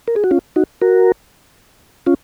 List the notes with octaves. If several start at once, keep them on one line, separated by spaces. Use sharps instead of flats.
A#4
G#4
F#4
C#4 F4
D#4 F#4
F#4 A#4
C#4 F4